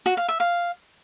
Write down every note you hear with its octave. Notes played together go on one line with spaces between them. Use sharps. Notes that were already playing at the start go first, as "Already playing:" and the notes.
F#4
F5
E5
F5